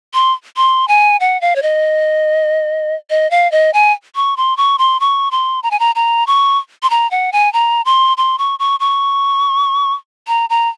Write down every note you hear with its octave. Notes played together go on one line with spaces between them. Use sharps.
C6
C6
G#5
F#5
F5
C#5
D#5
D#5
F5
D#5
G#5
C#6
C6
C#6
C6
C#6
C6
A#5
G#5
A#5
A#5
C#6
C6
A#5
F#5
G#5
A#5
C6
C6
C#6
C#6
C#6
A#5
A#5